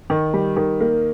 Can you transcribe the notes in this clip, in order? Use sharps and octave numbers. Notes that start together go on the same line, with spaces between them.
D#3
G3
D#3
A#3